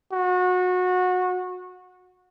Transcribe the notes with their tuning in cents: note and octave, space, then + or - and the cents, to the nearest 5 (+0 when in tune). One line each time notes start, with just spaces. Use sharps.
F#4 -25